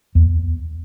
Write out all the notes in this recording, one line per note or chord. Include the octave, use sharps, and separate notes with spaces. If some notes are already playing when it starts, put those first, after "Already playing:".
E2